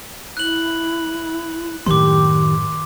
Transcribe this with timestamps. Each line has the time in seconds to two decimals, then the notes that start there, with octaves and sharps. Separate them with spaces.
0.37 E4 F#6 F#7
1.86 F#2 A2 D#3 G4 C6 D6